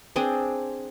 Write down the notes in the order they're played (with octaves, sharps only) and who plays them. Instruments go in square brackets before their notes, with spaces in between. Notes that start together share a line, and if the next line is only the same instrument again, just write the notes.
[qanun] C4 D4 G#4 C5